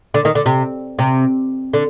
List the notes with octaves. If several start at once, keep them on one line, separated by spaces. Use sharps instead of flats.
D3
D#3
D3
C3
C3
D3